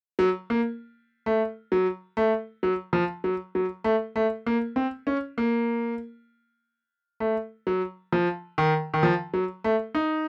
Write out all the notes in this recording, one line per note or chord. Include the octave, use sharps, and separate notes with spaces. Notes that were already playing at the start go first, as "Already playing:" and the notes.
F#3
A#3
A3
F#3
A3
F#3
F3
F#3
F#3
A3
A3
A#3
C4
C#4
A#3
A3
F#3
F3
D#3
D#3
F3
F#3
A3
D#4